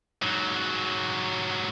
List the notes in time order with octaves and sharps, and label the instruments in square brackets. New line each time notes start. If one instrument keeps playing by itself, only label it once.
[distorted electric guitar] G#2 F#3